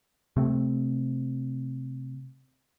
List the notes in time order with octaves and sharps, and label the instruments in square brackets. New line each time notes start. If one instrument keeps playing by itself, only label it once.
[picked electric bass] C3 A3 C4